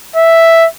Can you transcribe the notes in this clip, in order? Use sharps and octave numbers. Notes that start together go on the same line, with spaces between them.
E5